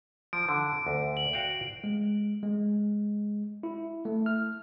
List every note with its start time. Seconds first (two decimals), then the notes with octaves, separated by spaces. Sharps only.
0.33 F3 D7
0.49 D3
0.86 D2
1.17 F#7
1.33 F#4 F5 G5
1.84 G#3
2.43 G#3
3.63 E4
4.05 A3
4.26 F6